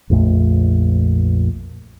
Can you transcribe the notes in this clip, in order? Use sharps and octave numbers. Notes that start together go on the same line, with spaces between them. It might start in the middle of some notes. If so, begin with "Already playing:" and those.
A#1 F2 A3